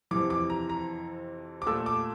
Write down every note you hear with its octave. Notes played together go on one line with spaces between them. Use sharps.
F2 C3 E3 D6
D6
A#5
A#5
D6
A#2 A3 E6
D6